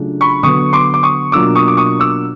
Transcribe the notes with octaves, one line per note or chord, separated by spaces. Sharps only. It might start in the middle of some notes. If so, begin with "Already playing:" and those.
Already playing: C#3 F#3 A3 D4 F4
B5 C#6
D3 F#3 B3 C#6 D#6
C6 D6
D6
C#6 D#6
B2 F#3 A#3 D4 F4 D6 E6
C#6 D#6
D6
C#6 D#6
D6 E6